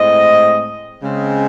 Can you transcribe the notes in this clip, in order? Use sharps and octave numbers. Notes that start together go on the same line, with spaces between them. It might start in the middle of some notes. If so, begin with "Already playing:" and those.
Already playing: A2 G#3 C4 D#5
C#3 G#3 C4